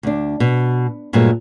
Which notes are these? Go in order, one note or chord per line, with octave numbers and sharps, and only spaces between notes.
D2 D4
B2
G2 A#2 F#3 G#3 A3